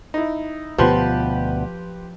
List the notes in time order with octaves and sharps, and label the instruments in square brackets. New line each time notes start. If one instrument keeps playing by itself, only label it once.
[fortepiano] D#4 E4
[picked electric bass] D2 B2 B3 [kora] F3 [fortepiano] G4 B4 C6